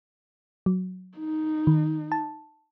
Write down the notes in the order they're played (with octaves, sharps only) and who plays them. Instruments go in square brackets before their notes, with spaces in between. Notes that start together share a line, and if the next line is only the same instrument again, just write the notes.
[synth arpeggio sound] F#3
[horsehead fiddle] D#4
[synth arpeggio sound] D#3
A5